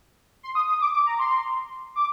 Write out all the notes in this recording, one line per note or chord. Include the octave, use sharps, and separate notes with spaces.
C6
D#6
D#6
D6
D6
A#5
C6
D6